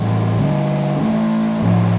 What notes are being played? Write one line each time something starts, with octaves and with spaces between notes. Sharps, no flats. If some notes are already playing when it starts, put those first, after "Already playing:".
Already playing: A2 E3 G3
D3 G3 C#4
E3 A3 C#4
A2 F3 C#4